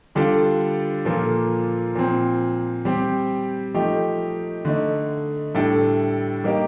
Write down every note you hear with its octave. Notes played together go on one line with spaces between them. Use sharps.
D3 G3 D4 F4 A4
A#2 F3 A#3 F4 A4
A#2 F3 C4
G3 C4 G4
F3 A3 D#4 G4
D3 A3 D#4
A2 G3 D4 A4
G3 A#3 D#4 G4